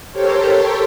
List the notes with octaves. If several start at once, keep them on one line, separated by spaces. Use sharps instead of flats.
G4 A4 A#4 C5 C#5